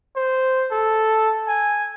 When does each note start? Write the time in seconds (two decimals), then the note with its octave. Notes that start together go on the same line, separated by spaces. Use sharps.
0.16 C5
0.71 A4
1.48 G#5